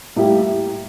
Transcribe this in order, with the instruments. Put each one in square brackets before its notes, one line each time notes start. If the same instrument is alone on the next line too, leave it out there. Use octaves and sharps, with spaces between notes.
[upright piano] A2 G3 A#3 E4 G4